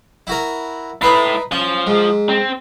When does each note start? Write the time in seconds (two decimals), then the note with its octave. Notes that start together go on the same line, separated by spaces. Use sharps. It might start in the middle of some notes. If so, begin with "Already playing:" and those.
0.27 E4 F#4 A#4
1.01 A3 D#4 E4 B4 C6
1.52 F3 C#4
1.87 G#2
2.29 C4